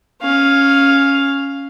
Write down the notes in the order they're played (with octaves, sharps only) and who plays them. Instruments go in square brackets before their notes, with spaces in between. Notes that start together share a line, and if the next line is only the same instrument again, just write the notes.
[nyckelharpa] C#4 F5